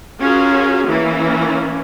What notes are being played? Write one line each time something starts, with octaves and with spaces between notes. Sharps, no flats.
C#4 F4 F#4 G#4 A#4
E3 A#3 C#4